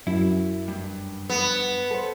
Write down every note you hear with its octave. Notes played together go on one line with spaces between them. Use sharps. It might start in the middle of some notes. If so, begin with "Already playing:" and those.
F#2 E4
G2
B3
A4 C5